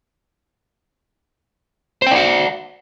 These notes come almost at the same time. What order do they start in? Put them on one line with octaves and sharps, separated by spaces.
C5 G5 D5 F#5